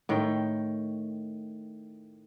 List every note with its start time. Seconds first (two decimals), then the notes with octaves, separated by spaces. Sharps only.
0.09 A2 D#3 G5